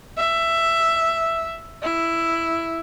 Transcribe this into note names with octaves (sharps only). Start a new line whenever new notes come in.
E5
E4